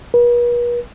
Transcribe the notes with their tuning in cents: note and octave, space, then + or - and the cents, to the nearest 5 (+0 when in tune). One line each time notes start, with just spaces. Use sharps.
B4 -45